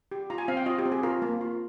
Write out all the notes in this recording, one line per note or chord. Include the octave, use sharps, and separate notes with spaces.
G4
F4 A#5
G#5
C4 F5
G5
F4 D#5
G4
C4
G#4
F4 A#4
A#3
F4